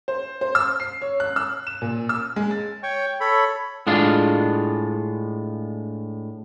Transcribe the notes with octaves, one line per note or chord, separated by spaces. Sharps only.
C5
C5
E6
C7
C#5
F#6
E6
E7
A#2
E6
G#3
A6
C#5 G5 C#6
A4 C#5 B5
A2 G#3 D4 F4